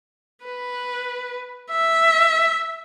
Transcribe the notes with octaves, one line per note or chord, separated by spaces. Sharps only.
B4
E5